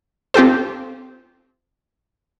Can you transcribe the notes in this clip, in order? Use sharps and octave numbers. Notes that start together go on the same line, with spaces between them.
C4 F4 G4 A4 C5